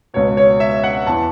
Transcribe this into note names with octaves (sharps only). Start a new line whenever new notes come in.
C#2 B2 C#5
C#5
E5
F#5
E2 E3 A5